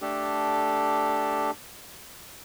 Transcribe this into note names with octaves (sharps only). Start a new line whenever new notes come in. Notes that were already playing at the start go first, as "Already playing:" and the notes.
A3 D4 G4 A4